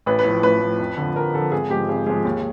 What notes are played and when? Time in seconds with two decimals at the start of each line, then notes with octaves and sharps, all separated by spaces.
0.06 A1 B4
0.19 B4
0.25 A2 F3
0.42 A1 B4
0.61 A2 F3
0.79 F2
0.97 D3 F3
1.15 F2 A#4
1.33 D3 F3 A4
1.52 G#1 G#4
1.70 G#2 F3 G#3 G4
1.88 G#1 G#4
2.06 G#2 F3 G#3 G#4
2.25 D#2